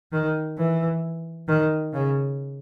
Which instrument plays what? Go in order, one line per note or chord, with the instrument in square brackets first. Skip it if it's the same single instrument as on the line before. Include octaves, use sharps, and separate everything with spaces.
[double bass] D#3
E3
D#3
C#3